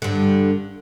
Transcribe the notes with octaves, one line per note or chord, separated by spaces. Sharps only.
G2 D3